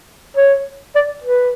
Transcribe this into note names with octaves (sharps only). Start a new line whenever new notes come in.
C#5
D5
B4